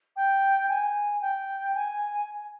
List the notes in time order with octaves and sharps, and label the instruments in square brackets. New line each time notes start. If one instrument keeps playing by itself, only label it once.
[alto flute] G5
G#5
G5
G#5